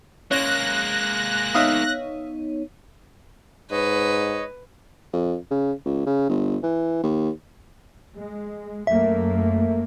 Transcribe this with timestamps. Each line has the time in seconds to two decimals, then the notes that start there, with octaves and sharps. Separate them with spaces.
0.31 G#3 A#3 C#4 F#6 A#6
1.55 B3 D#4 C#5 E5 F5 D#6
3.71 G#2 B4 C#5 D#5
5.13 F2
5.51 C#3
5.86 C#2
6.06 C#3
6.29 G1
6.63 E3
7.04 D#2
8.17 G#3
8.87 F#2 A3 A#3 E5